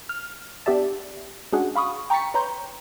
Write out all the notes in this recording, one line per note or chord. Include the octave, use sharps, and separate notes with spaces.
F6
B3 D4 G4 D5 E5 A5
G#3 C#4 D4 F#4 G#4 F#5
F5 B5 C#6 D#6
G5 A#5 C#6 A6 B6 C#7
B4 C#5 A#5 C6 G6